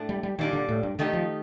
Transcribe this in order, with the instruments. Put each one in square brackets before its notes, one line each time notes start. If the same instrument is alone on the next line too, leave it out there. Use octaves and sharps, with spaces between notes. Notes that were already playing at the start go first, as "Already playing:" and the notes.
Already playing: [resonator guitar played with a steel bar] A2 A3 D4
[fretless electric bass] G3
G3
[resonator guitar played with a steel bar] A#2 G3 D4 [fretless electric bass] D#3
[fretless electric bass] D3
A2
G2
[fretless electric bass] D3 [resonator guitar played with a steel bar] D#3 A3 D#4 G4
[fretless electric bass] F3